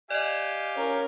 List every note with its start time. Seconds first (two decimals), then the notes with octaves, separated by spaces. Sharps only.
0.10 G4 D5 D#5 F5 G#5
0.76 C#4 A#4